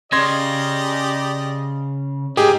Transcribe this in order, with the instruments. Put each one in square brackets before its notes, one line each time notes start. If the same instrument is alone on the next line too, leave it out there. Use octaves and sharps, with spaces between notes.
[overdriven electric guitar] C#3 [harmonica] G4 D5 D#5 [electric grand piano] C6 G#6 A#6
[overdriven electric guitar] G#2 [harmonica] D#4 [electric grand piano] G4 G#4